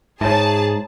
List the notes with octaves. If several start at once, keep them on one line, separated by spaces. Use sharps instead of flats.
G#2 G#4 C#5 E5 A5